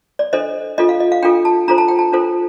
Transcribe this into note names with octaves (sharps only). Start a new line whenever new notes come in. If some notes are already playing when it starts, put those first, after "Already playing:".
D5
D4 A4 C5 D#5
D4 F4 A4 D#5
F5
D#5
F5
D4 F4 A4 G5
A5
D4 F4 A4 C5 A#5
A5
G5
A5
D4 F4 A4 C5